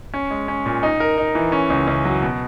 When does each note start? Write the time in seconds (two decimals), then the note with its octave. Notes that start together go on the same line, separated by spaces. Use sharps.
0.14 C#4
0.31 G#3
0.48 C#4
0.66 A#2
0.83 D#4
1.00 A#4
1.18 D#4
1.35 E3
1.52 C#4
1.70 C#2
1.87 C#2
2.05 F#3
2.22 B2